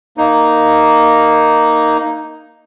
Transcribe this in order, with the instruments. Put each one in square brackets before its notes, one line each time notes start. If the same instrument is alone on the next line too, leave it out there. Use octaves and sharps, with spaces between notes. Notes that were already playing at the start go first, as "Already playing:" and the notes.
[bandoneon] A#3 D#4